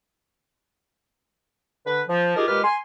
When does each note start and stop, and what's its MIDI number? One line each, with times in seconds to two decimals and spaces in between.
1.86 2.01 50
1.86 2.01 71
2.09 2.32 53
2.36 2.48 63
2.36 2.48 65
2.36 2.48 67
2.36 2.48 68
2.36 2.48 70
2.48 2.60 46
2.48 2.60 56
2.48 2.60 67
2.48 2.60 71
2.48 2.60 89
2.64 2.76 80
2.64 2.76 84